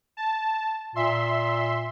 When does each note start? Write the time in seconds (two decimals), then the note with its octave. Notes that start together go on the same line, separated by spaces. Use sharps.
0.17 A5
0.96 A#2 E5 C6